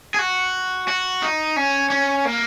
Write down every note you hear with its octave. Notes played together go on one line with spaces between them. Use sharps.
G#4
F#4
F#4
D#4
C#4
C#4
A#3